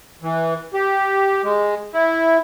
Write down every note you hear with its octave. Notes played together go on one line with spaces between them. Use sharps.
E3
G4
G#3
E4